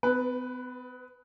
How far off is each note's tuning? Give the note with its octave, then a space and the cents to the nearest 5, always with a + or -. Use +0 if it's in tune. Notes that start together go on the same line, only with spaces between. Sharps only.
B3 +40 B4 +0